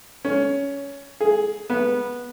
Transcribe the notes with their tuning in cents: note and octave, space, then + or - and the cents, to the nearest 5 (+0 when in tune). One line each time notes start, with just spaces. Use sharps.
C#4 +15
G#4 +5
B3 -15